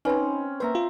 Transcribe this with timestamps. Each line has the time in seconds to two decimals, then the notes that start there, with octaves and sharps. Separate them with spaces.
0.05 C4 C#4 D#4 B4
0.60 A#3 B4 C5 E5 A#5
0.75 F4